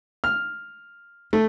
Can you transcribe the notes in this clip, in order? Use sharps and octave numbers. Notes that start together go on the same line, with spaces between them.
F6
A3